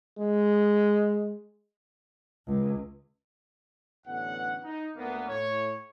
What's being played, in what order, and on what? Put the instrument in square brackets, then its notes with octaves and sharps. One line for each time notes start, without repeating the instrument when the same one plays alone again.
[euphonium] G#3
[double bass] C#2
[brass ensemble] A1 D3 B3 C#4 F#5
D#4
D2 A#3 B3
A2 C#5